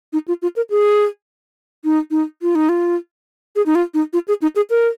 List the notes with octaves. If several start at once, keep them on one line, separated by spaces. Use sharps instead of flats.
D#4
F4
F4
A#4
G#4
D#4
D#4
F4
D#4
F4
G#4
D#4
F4
D#4
F4
G#4
D#4
G#4
A#4